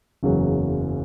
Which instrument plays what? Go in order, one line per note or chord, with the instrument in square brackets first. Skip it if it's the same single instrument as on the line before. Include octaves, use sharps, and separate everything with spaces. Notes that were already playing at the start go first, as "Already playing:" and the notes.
[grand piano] F#1 E2 C#3 F#3